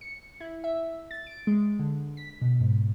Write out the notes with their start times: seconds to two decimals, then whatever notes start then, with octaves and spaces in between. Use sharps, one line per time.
0.01 C#7
0.40 E4
0.64 E5
1.11 A6
1.27 D7
1.47 G#3
1.79 D3
2.17 B6
2.42 B2
2.61 G#2